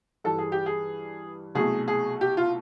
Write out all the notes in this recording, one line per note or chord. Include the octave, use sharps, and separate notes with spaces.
G2 E3 G3 A4
G#4
G4
G#4
C2 B2 F#3 A3 G#4
G#4
G4
F4